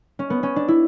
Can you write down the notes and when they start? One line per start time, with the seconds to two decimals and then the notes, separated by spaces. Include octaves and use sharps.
0.19 C#4
0.30 B3
0.43 C#4
0.56 D4
0.68 E4